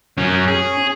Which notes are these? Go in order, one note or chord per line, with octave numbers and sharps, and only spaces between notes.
F#2 F#3 C#4
G#4